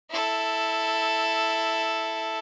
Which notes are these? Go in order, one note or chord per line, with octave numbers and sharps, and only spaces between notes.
E4 A4